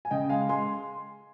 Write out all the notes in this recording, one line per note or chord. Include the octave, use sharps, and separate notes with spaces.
G#5
C#3 D#5 G5
G#3 F5 G#5
G#3 G#5 C6